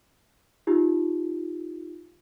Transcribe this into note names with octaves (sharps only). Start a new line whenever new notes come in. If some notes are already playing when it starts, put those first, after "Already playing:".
D#4 F4 G4